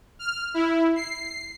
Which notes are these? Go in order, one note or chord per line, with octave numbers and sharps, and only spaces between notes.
F6
E4
C7